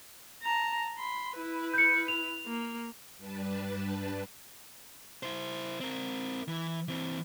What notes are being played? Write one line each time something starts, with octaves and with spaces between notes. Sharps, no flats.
A5 A#5
B5 C6
E4 B4
G6 C#7
F7
A#3
G2 G3 D4 B4 A5
E4 C5
C4 A#4
E3
E3 C4